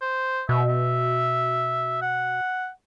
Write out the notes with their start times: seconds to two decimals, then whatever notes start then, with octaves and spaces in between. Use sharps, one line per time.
0.01 C5
0.49 B2 E5
0.69 E5
2.02 F#5